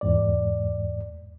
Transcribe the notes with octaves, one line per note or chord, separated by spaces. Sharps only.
E2 G#2 D5